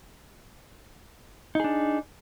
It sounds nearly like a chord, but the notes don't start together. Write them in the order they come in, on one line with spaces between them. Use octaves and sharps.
D#4 G#4 D4